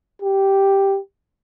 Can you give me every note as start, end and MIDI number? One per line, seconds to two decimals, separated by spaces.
0.22 0.98 67